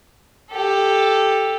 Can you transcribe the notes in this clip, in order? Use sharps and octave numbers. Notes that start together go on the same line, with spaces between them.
G4 A4